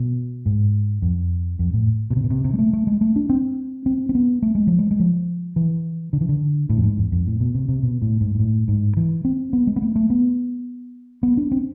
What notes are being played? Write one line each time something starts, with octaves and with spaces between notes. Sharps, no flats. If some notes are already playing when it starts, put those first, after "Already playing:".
Already playing: B2
G#2
F2
F2
A2
B2
C3
B2
C3
C3
G#3
A3
A3
G#3
A3
D4
C4
C4
C4
B3
A3
G#3
F3
G#3
G#3
F3
E3
D3
E3
D3
A2
F2
G#2
E2
F2
A2
B2
C3
C3
B2
A2
G#2
G#2
A2
G#2
E3
C4
B3
G#3
B3
A3
A3
B3
B3
D4
C4